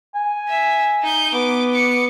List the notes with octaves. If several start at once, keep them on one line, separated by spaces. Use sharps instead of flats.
G#5
E5
D#4 G6
B3 D6
D6 C#7